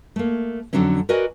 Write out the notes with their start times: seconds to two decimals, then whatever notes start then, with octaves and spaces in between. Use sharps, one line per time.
0.16 A3 A#3
0.73 F2 G#2 D3 F#3 C4 C#4
1.09 F#4 A#4 B4 D5 D#5 G#5